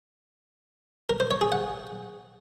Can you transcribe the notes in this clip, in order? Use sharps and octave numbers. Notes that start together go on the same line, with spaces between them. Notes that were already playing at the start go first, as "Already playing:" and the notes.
A#4
C5
C#5
G#4
F#5